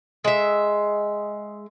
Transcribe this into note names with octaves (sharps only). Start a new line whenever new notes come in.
G#3 E5